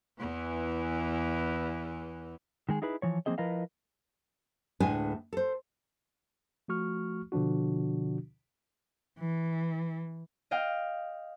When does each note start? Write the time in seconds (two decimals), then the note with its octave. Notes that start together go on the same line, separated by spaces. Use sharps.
0.19 E2 E3
2.69 D#3 G#3 G#4
2.82 D#4 E4 G#4 B4
3.02 E3 F3 C#5
3.26 F3 F#3 A#3 C4 G#4 D#5
3.38 F3 E4 A#4 B4 D#5 F5
4.80 D2 A2 G#3 D4 B4 G#5
5.33 A4 C5
6.68 F3 A3 F#4 C#6 F6
7.32 B2 D3 F3 D4 F#4
9.19 E3
10.51 D#5 F5 G5